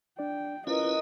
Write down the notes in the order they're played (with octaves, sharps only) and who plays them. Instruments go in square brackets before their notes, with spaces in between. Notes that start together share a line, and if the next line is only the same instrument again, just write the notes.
[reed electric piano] D4 D5 [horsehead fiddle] G5
[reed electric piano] C#4 F4 [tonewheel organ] E4 B4 [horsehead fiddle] A#4 D#5